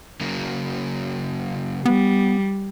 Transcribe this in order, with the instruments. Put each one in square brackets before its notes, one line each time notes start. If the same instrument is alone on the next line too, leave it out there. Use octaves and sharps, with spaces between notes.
[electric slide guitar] C#3 F#3 A#3
[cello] G3 [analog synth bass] B3